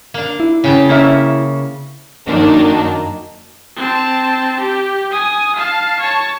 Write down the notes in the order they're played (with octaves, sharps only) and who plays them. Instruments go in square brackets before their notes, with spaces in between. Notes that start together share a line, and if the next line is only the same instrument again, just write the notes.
[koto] A#3 D4
[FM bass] E4
[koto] C#3 G5 A5
[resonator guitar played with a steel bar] A#3 C#4 E5
[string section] F#2 D#3 F#3 A#3 D4 D#4
[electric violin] C4 A5
G4
G#5 D#6
F5 A5
C#5 A5